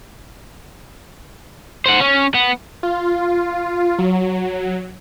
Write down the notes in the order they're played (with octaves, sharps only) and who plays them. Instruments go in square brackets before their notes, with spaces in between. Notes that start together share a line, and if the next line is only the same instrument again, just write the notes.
[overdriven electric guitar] C5 F#5
C#4
B3
[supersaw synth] F4
F#3